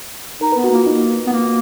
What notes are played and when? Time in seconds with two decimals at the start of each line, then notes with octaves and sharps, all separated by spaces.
0.41 D#4 A#4
0.52 B3 B4
0.64 F#4
0.71 A#3 F4
0.86 A#3 D#4
1.26 B3
1.32 A#3